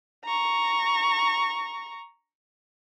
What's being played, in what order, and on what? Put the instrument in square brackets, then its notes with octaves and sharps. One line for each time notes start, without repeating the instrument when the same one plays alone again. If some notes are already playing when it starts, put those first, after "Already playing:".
[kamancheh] A#5 C#6